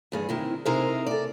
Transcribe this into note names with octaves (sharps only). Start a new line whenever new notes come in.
E2 G2 G#4
C3 D#3 E4
C3 D#4 E4 G#4 A#4 C5
A4 D5